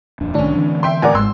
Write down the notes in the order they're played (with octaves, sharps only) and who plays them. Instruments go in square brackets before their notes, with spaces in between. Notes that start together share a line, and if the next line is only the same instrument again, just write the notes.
[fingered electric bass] D#1 F2 D4
[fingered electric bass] C2 D#3 [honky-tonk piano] A2 C#4 [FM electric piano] D4
[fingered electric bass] D3 E3 C4
[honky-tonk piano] E5 G5 C6
[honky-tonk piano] A1 A#4 [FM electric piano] D5 F#5 G#5
[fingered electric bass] G#1 G#3 [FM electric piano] G#2 [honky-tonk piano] C6 E6